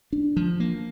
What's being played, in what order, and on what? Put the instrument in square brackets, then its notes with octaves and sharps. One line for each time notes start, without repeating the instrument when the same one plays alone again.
[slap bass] D4
F3
A#3